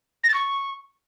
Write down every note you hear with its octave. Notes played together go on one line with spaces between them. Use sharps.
A#6
A6
C#6